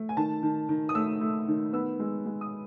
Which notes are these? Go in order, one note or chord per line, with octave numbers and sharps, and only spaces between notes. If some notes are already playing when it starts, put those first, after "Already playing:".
Already playing: A3
G#5
D#3 A5
D#3
D#3
D#6
A3 E6
A3
D#3
B3 E6
G#3
G#3
D#6